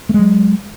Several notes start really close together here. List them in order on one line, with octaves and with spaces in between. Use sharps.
A3 G#3 F#3